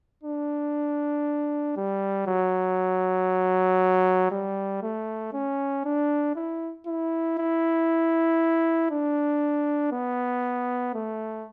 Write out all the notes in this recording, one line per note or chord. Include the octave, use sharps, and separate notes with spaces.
D4
G3
F#3
G3
A3
C#4
D4
E4
E4
E4
D4
B3
A3